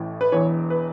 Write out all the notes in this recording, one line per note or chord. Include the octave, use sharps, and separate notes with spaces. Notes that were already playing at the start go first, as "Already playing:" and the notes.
Already playing: A1 A2 E3
B4
E1 E2 E3 C#5
B4